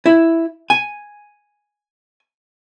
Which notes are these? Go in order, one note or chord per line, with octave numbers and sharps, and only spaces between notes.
E4
G#5